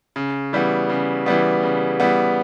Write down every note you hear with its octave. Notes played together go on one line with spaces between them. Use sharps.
C#3
E3 G3 B3
C#3
E3 G3 B3
C#3
E3 G3 B3